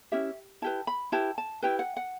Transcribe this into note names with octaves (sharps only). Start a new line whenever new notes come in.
C#4 E4 G4 E5
E4 G4 B4 A5
B5
E4 G4 B4 A5
A5
E4 G4 B4 G5
F#5
F#5